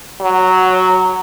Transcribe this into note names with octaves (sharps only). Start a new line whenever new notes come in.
F#3